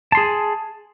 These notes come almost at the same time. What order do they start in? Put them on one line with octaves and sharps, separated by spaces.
A5 C6 G#4